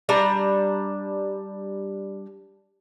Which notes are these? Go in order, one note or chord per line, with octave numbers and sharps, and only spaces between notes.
G3 D4 A#5